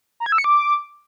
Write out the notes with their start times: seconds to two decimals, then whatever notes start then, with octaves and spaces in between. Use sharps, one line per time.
0.20 A#5
0.26 G#6
0.32 E6
0.38 C#7
0.44 D6